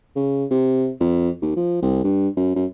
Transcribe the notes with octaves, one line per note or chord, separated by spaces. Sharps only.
C#3
C3
F2
D#2
F3
C2
G2
F#2
F#2